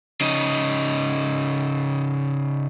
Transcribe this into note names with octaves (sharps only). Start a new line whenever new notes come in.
C#3 D#4